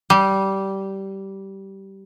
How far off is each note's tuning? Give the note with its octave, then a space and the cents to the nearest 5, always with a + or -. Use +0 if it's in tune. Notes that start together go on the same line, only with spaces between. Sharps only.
G3 -15